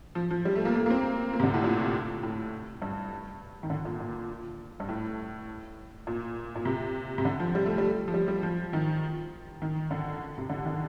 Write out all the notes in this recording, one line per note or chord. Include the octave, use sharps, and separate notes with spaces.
F3
F3
G3
A3
A#3
A#3
A#3
C4
A#3
C3
D3
A2
A#2
A2
G2
D#3
D3
A#2
A#2
G2
A2
A#2
A#2
C3
C3
D3
F3
G3
A3
G3
F3
G3
G3
F3
D#3
D#3
D3
C3
D3
D#3